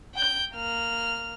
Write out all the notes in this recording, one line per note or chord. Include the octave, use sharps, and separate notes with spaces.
G5 G6
A#3 F6